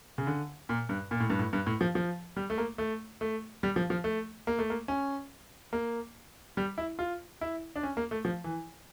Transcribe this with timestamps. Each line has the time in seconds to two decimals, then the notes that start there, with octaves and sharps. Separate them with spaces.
0.18 C#3
0.27 D3
0.69 A#2
0.89 G2
1.11 A#2
1.20 A2
1.30 G2
1.39 A2
1.53 G2
1.66 A2
1.81 F3
1.95 F3
2.36 G3
2.50 A3
2.58 A#3
2.78 A3
3.21 A3
3.63 G3
3.76 F3
3.90 F3
4.04 A3
4.47 A#3
4.59 A3
4.70 A#3
4.88 C#4
5.73 A#3
6.57 G3
6.78 E4
6.99 F4
7.41 E4
7.76 D4
7.83 C#4
7.97 A#3
8.11 A3
8.25 F3
8.44 E3